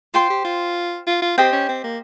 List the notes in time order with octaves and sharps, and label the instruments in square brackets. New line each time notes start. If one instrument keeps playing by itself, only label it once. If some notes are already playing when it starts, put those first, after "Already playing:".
[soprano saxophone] F4 [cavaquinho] C5 G5 C6
[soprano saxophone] G4
F4
F4
F4
[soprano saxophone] C4 [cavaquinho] G4 C5 D#5 G5
[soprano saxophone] C#4
C4
A#3